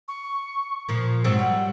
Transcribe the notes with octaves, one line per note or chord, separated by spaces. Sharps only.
C#6
A#2 F3
G#2 F#3 C4 E6
G3 F#5